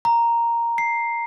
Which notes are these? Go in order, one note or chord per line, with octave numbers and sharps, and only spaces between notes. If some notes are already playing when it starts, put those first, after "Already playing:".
A#5
C7